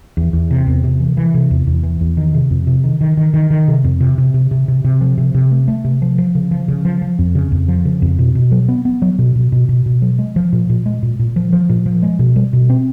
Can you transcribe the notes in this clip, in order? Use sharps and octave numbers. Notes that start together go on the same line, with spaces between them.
E2
E2
C3
E2
C3
E3
E3
C3
E2
E2
E3
E2
D#3
C3
F2
C3
D#3
D#3
D#3
D#3
D#3
C3
F2
C3
C3
C3
C3
C3
C3
F3
C3
C3
A3
A3
C3
F3
F3
C#3
F3
C#3
F3
F3
F2
C#3
F2
F3
C#3
F2
B2
B2
F#3
B3
B3
F#3
B2
B2
B2
B2
B2
F#3
G#3
F3
A#2
A#2
G#3
A#2
A#2
F3
F3
A#2
F3
G#3
B2
G3
B2
C4